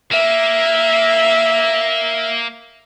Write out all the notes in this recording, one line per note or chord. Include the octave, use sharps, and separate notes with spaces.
A#3 E5